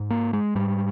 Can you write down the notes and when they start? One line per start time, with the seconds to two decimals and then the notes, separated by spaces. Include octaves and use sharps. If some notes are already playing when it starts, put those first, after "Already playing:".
Already playing: G#2
0.10 A#3
0.33 G#3
0.55 G#2 G3